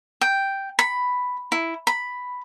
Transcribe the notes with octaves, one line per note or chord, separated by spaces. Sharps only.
G5
B5
E4
B5